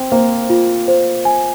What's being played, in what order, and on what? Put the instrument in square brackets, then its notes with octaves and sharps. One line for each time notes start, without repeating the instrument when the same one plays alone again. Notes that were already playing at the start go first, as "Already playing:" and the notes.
Already playing: [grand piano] C4 [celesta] G5
[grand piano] A#3 [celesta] C5
[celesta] F4
C5
G#5